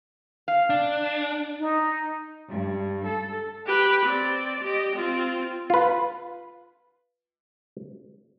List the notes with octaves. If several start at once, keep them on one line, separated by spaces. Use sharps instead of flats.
F5
D4
D#4
G2
A4
G4 B4
C4 D5
G4 D#5
C4 F4
F4 B4